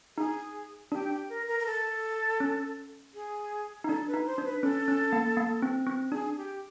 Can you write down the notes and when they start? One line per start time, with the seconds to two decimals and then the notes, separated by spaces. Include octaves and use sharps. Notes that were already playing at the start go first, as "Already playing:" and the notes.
0.17 D#4 G#4
0.92 D4 G4
1.10 G4
1.29 A#4
1.47 A#4
1.60 A#4
1.66 A4
2.40 C#4
3.14 G#4
3.84 D#4
3.89 D4 A4
4.08 B4
4.14 D#4
4.26 C5
4.38 D4
4.45 B4
4.63 C#4 A4
4.88 C#4
5.13 A#3
5.37 A#3
5.62 C4
5.87 C4
6.12 D4 G#4
6.37 G4